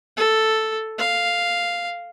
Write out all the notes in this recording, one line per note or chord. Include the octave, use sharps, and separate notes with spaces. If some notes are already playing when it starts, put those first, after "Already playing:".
A4
F5